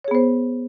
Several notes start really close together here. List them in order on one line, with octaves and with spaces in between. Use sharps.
C#5 G#4 B3 C5